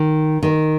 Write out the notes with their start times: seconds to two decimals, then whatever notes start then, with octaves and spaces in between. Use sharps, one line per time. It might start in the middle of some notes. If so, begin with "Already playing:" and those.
Already playing: D#3
0.43 D#3